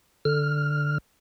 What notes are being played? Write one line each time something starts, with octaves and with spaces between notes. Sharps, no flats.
D3 F6